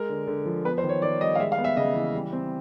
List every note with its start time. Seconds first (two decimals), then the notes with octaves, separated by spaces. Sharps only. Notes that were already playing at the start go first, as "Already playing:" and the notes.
Already playing: G#3 A#4
0.09 D3
0.28 D3
0.46 F3
0.64 B3 B4
0.78 C5
0.84 D#3
0.89 C#5
1.02 D#3 D5
1.21 G3 D#5
1.35 F5
1.39 G#3 E5
1.52 F5
1.58 B3
1.64 E5
1.77 C#3 D#5
1.95 E3
2.14 G3
2.33 C4